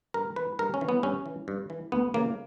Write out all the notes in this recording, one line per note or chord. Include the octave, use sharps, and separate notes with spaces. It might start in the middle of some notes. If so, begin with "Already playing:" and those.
G2 A#4
E3 B4
G2 A#4
C#4
E3
B3
G2 C#4
E3
G2
E3
D2 B3
C#3 E3 A#3